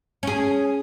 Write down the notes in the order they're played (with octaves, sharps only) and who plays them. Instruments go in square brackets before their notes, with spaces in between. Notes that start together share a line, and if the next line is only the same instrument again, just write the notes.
[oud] C#4 G#4